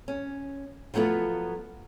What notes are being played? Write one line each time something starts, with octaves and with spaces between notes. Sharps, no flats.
C#4
F3 F#3 A3 B3 F4